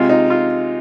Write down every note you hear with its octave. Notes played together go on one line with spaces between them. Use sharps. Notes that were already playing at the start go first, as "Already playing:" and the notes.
Already playing: C3 G#3 F4
D#4
F4